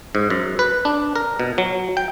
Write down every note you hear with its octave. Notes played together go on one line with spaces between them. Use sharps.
G#2
F#2
B4
D4
A#4
B2
F#3
G5